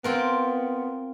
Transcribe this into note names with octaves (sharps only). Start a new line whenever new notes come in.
B3 C4 F4 A#4